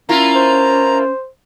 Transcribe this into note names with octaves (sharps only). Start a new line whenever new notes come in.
A#3 C#4 E4 F4 A#5
C5